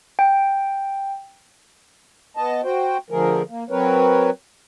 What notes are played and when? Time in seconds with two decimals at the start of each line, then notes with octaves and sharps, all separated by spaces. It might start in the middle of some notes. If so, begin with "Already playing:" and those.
0.19 G5
2.37 B3 D#5 A5
2.64 F#4 C5 G5
3.10 D3 F3 A3 G#4 A#4
3.49 A#3
3.70 F#3 C4 A#4 B4 C#5